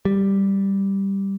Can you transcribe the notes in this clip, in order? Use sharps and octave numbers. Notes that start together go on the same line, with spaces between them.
G3